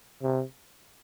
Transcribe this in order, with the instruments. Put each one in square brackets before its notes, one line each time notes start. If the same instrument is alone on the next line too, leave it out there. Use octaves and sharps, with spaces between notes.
[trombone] C3